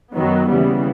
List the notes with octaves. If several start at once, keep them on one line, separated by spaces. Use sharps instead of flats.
F#2 D#3 F#3 B3
D#2 C#3 E3 G3 B3